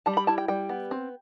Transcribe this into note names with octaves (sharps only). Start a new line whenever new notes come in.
G3 A5
B5
E4 A5
G5
G3 G5
B3
C4